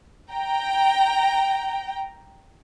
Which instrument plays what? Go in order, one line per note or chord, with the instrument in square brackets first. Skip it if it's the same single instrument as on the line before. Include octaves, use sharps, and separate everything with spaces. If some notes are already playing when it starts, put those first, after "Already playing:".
[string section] G5 A#5